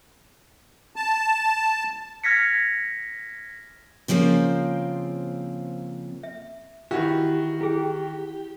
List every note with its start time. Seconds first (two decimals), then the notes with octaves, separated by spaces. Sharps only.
0.96 A5
2.24 F6 G#6 A#6 B6 C#7
4.08 C#3 F3 A#3 C4 C5
6.23 E5
6.91 D#3 E3 F#4 G4
7.61 E4 G4 G#4 G5